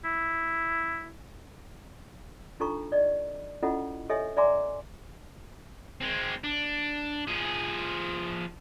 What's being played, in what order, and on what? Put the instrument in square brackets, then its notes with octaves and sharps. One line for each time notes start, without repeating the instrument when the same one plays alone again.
[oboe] E4
[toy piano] D4 D#4 F4 A4 A#5 C#6
D5 D#5
C#4 E4 F4 A4 D#5 F#5
G4 A4 C#5 D#5 E5 G#5
D5 E5 G#5 A#5 C6 D6
[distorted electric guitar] G#3 C4
D4
F3 G#4